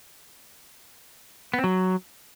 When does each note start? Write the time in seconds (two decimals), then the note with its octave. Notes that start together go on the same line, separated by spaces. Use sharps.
1.54 B3
1.59 C4
1.64 F#3